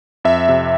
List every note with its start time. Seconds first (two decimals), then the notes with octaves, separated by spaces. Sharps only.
0.24 F2 E5
0.48 C3